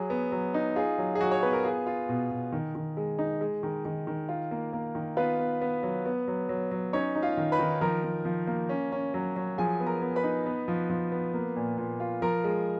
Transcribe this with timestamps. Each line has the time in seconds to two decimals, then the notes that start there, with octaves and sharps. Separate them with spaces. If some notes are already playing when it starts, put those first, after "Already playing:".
Already playing: F#3 G#4
0.10 B3
0.32 F#3
0.54 D#4
0.76 F4 G#4
0.98 F#3
1.15 G#4
1.21 F#3 F#4
1.31 C#5
1.43 B3 B4
1.53 A#4
1.64 F4 G#4
1.86 F4
2.09 B2
2.30 B2
2.52 D#3
2.75 D#3
2.97 G#3
3.19 D#4
3.41 G#3
3.63 D#3
3.85 D#3
4.07 D#3
4.29 F4
4.51 A#3
4.73 A#3
4.95 D#3
5.17 B3 F4 B4
5.39 B3
5.61 B3
5.83 F#3
6.06 B3
6.28 F#3
6.49 F#3
6.71 F#3
6.93 C#4 D#4 C#5
7.15 D#4
7.23 F4 F5
7.37 D#3
7.52 B4 B5
7.59 D#3
7.81 F3 A#4 A#5
8.04 F3
8.25 F3
8.47 A#3
8.69 C#4
8.92 C#4
9.14 F#3
9.36 F#3
9.58 F3 G#4 G#5
9.80 B3
9.87 A#4 A#5
10.01 B3
10.16 B4 B5
10.24 D#4
10.46 B3
10.68 F3
10.89 F3
11.12 B3
11.34 A#3
11.56 A#2
11.77 A#2
12.00 F4
12.22 F3 A#4 A#5
12.44 G#3